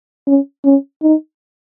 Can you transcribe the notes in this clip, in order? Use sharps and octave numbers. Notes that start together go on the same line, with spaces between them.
C#4
C#4
D#4